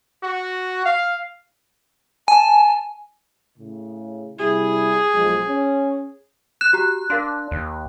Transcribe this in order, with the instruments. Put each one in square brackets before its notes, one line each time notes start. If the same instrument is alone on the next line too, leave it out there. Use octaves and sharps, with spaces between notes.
[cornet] F#4
F5
[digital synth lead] G#5 [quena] A5
[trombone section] A2 C#3
[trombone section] C3 G3 E4 [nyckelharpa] G#4
[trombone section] B1 F3 G#3
C#4
[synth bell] F#6 [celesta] E7
[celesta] F#4 G4 A#5
[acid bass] D4 [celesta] A#4 F5 C6
[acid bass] D#2